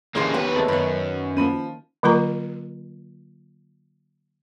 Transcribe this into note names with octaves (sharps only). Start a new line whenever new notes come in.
A1 C#3 G#3 A#3 D4 G4 B5 C6
D#2 F#3 B3 G4 B4 C#5
C3 G#3 A3 A5 A6
F#2 D#3 B3 F#5 B5
F3 A#3 C#4 B5 D#7
D3 F#3 A#3 F4 A#4 A#5